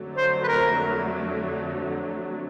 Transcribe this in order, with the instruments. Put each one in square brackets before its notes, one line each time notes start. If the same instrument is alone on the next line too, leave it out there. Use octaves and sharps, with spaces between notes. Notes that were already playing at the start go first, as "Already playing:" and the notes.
Already playing: [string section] F2 D3 F#3 A3
[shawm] C5
B4
A#4